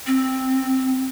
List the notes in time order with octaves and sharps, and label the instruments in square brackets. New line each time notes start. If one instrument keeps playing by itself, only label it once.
[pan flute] C4